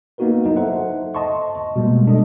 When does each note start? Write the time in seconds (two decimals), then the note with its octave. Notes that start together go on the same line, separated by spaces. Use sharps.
0.18 A#3 B3 D#4 F#4 A#4 B4
0.45 F#3 D#4 E4
0.57 A4 C5 E5 F#5
1.15 D#5 A5 C6 C#6
1.76 B2 G3 G#3 A#3
2.07 D4 A4 D#5